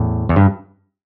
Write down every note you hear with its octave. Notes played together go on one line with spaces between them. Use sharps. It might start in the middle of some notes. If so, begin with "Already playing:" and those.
Already playing: E2 A2
E2
G2